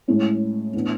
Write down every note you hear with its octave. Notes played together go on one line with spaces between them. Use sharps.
A2 G#3 C#4 E4
A2 E3 B3 D4